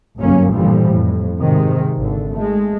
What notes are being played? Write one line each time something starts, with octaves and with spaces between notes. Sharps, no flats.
G1 C2 F#2 F#3 A#3 C#4
A#2 D3 E3 F3 G3
F2 A2
G#2 C3 D#3 G#3
G#1 D3
G#3 A3